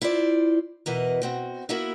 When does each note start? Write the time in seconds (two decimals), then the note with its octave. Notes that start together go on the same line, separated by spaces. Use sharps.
0.01 E4 F4 C5 D5
0.86 E2 B2 E3 A#4 D#5
1.22 B2 C4 F#4
1.69 A#3 B3 E4 F#4 A#4 E5